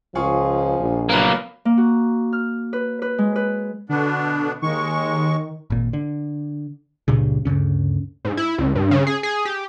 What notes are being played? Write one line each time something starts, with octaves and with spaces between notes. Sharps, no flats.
C#2 F3 F4 G#4 C#6
A#1
F#3 A#3 B3 B4 F5
A#3
F#4
F6
B4
B4
G#3
B4
B2 D3 B3 D4
D#2 D#3 G#3 C#6
G#1 A#2
D3
C#2 G2 A#2 C#3
D2 G2 C#3 C#4
G#2
E4
C#2
G2
C#3
G#4
G#4
G4